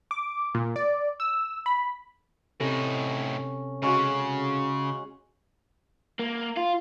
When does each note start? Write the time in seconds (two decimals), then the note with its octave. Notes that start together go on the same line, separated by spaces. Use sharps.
0.11 D6
0.55 A#2
0.76 D5
1.20 E6
1.66 B5
2.60 A2 C3 C#4 D#4 A4 A#6
3.82 C#3 G#3 C#4 F#4
6.19 A#3
6.57 F4